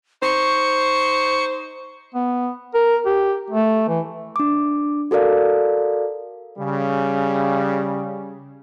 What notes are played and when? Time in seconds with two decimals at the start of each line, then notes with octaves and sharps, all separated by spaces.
0.23 D#4 C5 C#6
2.14 B3
2.74 A#4
3.06 G4
3.50 A3
3.88 E3
4.36 D4 D6
5.11 F#4 A4 A#4 D5 F5
6.58 C#3 G3